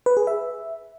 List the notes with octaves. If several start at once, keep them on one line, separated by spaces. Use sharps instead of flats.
B4
G#4
E5